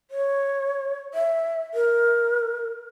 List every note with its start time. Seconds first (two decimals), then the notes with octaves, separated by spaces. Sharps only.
0.11 C#5
1.14 E5
1.74 A#4